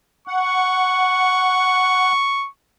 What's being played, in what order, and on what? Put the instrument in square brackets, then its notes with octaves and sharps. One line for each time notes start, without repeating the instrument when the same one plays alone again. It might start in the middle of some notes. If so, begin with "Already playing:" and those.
[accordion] F#5 [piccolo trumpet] C#6